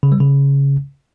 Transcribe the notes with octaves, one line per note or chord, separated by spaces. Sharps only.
C#3
G3
C#3